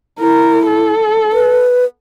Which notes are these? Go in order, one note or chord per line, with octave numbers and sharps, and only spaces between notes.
E4 A#4
A4
B4